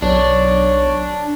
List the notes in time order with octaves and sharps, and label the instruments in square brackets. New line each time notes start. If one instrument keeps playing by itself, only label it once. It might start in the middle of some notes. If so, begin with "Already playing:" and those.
[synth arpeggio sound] B1 [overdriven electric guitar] D4 [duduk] C#5